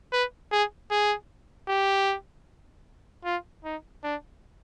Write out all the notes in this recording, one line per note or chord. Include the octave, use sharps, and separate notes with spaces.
B4
G#4
G#4
G4
F4
D#4
D4